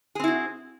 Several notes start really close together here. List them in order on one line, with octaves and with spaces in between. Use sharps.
G#4 C4 E4 F#4